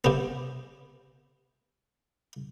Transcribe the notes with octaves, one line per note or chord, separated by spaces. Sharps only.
C3 B3